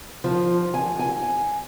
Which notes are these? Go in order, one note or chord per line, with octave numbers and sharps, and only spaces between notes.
F3
G#5
G#5